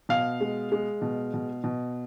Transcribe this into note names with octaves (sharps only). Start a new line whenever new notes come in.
B2 F5
G#3
G#3
B2
B2
B2